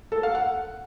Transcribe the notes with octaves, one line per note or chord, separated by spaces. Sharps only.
A4
F5
F#5